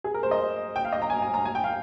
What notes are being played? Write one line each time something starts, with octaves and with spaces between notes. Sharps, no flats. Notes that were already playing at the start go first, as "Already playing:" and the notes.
G#4
A#4
C5
D#5
G5
F5
D#5
A#5
G#5
G#5
A#5
G#5
G5
F5